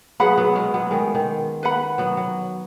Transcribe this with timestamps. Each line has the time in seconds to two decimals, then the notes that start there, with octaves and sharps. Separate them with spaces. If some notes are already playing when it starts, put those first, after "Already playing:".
0.20 F#3 B3 G#4 B4 F#5 B5
0.37 F#3 B3
0.55 G#3 C#4
0.74 F#3 B3
0.91 D#3 G#3
1.15 D#3
1.63 B4 F#5 B5
1.98 F#3 B3
2.17 F#3